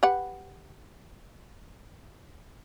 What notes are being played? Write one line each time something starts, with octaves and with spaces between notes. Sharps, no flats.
G4 B4 F#5